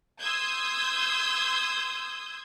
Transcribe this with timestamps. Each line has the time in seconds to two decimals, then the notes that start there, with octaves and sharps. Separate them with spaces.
0.21 C6 D#6 E6 G6 G#6